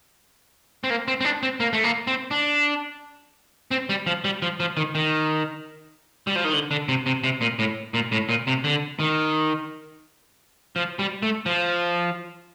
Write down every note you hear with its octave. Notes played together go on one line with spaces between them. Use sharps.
C4
A#3
C4
C4
D4
C4
A#3
A3
A#3
C4
D4
C4
G3
F3
G3
F3
F3
D#3
D#3
G3
F3
D#3
D3
D3
C3
C3
C3
A#2
A2
A#2
A2
A#2
C3
D3
D#3
F3
G3
A3
F3